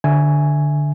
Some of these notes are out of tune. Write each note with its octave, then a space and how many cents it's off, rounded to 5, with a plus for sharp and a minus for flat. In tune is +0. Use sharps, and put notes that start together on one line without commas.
D3 +0 E5 +0 G#5 +0